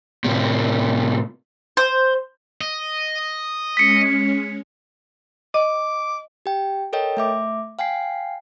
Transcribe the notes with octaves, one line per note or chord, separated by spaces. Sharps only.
A2 C3
C5
D#5
G#3 C#4 B6 C#7
D#5 D6
G4 G5
A4 A#4 C#5 D#5 G5
A3 E5 D6
F5 G5 G#5 C7